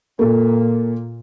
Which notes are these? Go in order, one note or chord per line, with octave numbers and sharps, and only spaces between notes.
A#2 A#3 A4